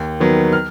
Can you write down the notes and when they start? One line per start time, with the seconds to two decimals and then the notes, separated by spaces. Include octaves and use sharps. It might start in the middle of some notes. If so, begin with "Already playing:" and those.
Already playing: D#2
0.20 D#3 F#3 B3
0.53 F6